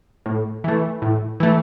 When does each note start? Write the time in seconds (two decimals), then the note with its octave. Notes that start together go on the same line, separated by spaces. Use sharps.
0.26 A2
0.64 E3 A3
1.02 A2
1.40 E3 A3